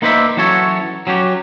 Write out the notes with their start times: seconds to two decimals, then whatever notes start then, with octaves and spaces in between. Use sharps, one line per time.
0.02 A#3 D#4 B4 C5 D5 E5
0.37 E3 F#3 C#4 F#4 A4 C#5
1.07 F#3 C#4 F#4 G4